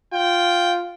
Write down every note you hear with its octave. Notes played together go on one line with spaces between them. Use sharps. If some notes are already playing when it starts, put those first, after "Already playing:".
F4 G5